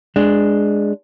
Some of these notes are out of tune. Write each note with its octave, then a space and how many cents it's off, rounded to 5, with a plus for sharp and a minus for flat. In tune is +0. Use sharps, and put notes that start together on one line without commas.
G#3 +0 D4 +0